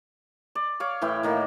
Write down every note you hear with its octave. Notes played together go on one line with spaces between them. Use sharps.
D5
C#5 F5 D6
A2 E3 E4 G5
A2 D#3 A#3